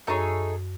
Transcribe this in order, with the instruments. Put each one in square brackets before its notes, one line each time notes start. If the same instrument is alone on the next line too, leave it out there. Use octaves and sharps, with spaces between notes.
[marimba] F#2 [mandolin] A3 D#4 G#4 C#5